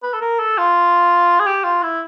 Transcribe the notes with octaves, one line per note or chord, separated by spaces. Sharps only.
B4
A4
A#4
A4
F4
G#4
G4
F4
E4